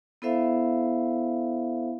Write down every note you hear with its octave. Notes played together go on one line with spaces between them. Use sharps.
B3 E4 A4 C5 E5 F5